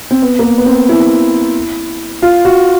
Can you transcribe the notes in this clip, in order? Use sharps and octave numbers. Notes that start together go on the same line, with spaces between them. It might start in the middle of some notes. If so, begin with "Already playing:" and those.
C4
B3
A#3
B3
B3
C4
E4
F4
F#4